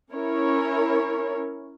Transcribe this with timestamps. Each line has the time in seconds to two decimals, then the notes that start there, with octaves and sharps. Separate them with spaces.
0.10 C#4 E4 A#4 C#5